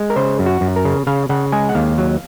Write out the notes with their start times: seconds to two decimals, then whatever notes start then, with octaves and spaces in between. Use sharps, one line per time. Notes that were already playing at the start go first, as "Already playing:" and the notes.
Already playing: G#3
0.10 A#4
0.16 C#3 C5
0.39 F#2
0.46 F#4
0.61 F#2
0.76 A#4
0.85 C#3
1.07 C#3 F5
1.29 C#3 F#5
1.52 G#3 G#5
1.69 F#5
1.75 D#2 F5
1.98 F#3